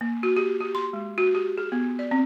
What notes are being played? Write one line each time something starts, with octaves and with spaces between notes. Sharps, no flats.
A#3
F#4
G4
G4
C6
G#3
F#4
G4
G#4
B3
D5
C4